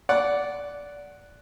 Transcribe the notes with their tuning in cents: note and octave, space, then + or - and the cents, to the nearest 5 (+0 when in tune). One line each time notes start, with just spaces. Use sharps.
D5 -15 F#5 +0